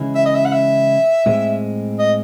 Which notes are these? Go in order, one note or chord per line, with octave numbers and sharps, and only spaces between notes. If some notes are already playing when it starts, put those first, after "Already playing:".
Already playing: C#3 E3 G#3 C#4 E4
E5
D#5
E5
F#5
E5
A2 G#3 C4
D#5